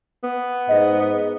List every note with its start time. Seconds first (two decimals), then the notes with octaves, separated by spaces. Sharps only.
0.24 B3
0.69 G#2 D#5